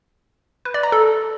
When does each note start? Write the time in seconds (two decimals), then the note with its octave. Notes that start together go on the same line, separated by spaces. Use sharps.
0.65 B4
0.74 D5
0.83 A#5
0.92 A4